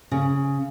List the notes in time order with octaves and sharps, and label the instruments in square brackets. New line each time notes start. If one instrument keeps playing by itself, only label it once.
[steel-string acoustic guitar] C#3